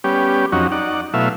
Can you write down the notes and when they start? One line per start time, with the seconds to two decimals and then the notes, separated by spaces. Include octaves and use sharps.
0.04 G3 B3 C#4 G4
0.52 F2 F#3 C#4 D#4 F#4
0.72 D#4 D5 F#5
1.14 B2 F#3 A3 E4 E5 F5